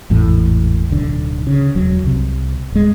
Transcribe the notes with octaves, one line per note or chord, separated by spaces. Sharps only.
G#1 E2 A2 E3
D1 B1 D3
C#3
E1 F#3
C2 C3
D1 G#3